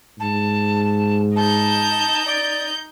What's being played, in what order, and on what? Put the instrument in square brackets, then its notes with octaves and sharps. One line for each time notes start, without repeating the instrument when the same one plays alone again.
[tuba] G#2 [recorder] A5
[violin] D#4 G6 [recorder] A5
[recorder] D5